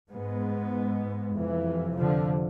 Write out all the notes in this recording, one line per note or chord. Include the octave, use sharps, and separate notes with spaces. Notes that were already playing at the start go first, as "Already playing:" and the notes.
G#2 G#3 B3
F2 C3 E3
D3 F3